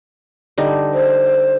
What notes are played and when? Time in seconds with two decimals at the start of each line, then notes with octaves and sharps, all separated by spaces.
0.58 D3 G3 D#4
0.93 C5